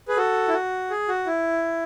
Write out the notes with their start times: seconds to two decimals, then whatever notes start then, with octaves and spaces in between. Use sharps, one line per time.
0.08 G#4 B4
0.17 F#4 A4
0.48 E4
0.53 F#4
0.90 G#4
1.08 F#4
1.26 E4